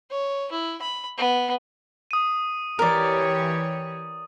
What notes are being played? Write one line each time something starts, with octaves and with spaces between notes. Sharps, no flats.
C#5
E4
B5
B3
D#6 D#7
E3 G4 A#4 C#5 D5